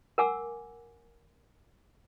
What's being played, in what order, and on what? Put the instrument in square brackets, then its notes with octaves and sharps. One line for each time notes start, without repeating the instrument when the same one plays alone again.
[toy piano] A#4 F#5 G#5 D6 E6